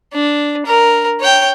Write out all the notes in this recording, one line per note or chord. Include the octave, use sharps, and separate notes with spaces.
D4
A#4
C#5 G5